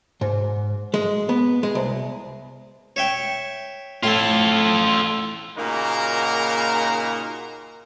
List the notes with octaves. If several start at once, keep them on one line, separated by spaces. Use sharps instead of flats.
G#2
G#3
B3
G#3
C2
C#5 E5 G5
A2 E4 F4 A4 C6
A#2 C#3 A#3 D#4 F#4 A#4